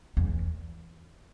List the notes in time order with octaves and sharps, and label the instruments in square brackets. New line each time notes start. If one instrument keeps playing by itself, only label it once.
[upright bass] E2